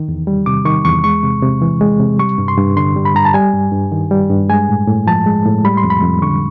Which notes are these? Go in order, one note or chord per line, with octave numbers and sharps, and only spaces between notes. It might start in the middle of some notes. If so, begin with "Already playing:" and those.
Already playing: D#3
E2
G3
C3 D6
D#3 C#6
E2 C#6
G#3 C#6
C3
C3
E3
G#3
C3
G3 C#6
G2
C6
G2
D3 C6
G3
B5
G2 A#5
A5
G3 G#5
G2
G2
D#3
G3
G2
G#3 G#5
A2
A2
F3 A5
G#3
A2
G3 B5
C6
F2
B5
F2
D3 C#6